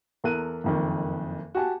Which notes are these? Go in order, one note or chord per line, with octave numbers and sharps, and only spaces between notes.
E2 A4 A#4 F#6 D#7
F#1 F2 D#3
F#4 G4 G#5 A5